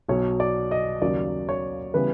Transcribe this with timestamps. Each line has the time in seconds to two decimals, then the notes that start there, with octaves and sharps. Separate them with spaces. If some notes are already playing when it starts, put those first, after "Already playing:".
0.08 B1 B2 F#3 C#5
0.40 D5
0.71 D#5
1.02 D#2 C#3 F#3 A#3 D5
1.49 C#5
1.94 C#3 E3 G3 B3 B4